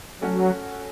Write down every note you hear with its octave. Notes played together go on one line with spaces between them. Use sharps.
F#3 A3 C#4 F#4 A4